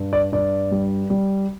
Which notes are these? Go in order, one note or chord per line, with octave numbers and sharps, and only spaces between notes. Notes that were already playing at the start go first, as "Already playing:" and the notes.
Already playing: G2
D5
G2 D5
G3
G3